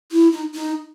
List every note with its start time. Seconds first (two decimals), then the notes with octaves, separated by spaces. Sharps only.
0.12 E4
0.32 D#4
0.54 D#4